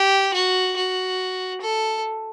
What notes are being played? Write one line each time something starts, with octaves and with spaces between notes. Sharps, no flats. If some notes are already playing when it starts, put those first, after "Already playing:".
Already playing: G4
F#4
F#4
A4